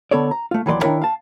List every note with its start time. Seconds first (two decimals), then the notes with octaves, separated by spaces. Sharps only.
0.11 D3 B3 A4 C#5 D5
0.31 A#5
0.51 A3 F4
0.66 D#2 E3 F#3 B4 D5 C6
0.82 D#3 F3 D4 E4 A#4 C#5
1.02 F5 A5